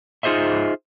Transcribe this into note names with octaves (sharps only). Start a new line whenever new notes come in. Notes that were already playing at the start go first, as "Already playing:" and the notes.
D#4 F4 G#4 C5 D#5 E5